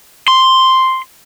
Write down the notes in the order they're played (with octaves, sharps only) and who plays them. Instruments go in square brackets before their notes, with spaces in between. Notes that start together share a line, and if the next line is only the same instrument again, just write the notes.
[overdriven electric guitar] C6